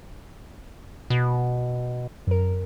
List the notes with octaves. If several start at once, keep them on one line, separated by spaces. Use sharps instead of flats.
B2
F#2 A#4